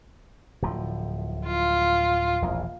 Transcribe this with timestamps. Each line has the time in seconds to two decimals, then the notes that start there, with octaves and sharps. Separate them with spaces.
0.62 D1 A2 F3
1.47 F4
2.42 E1 A#1 E2